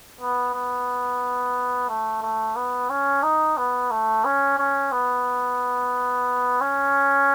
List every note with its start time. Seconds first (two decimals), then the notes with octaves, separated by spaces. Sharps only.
0.21 B3
0.54 B3
1.89 A3
2.22 A3
2.56 B3
2.90 C#4
3.23 D#4
3.57 B3
3.91 A3
4.25 C#4
4.58 C#4
4.92 B3
6.61 C#4